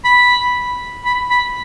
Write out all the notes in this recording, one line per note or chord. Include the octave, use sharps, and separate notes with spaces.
B5
B5
B5